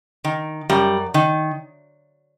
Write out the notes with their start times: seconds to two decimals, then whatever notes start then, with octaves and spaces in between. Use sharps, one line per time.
0.24 D#3
0.69 F#2 G3
1.14 D#3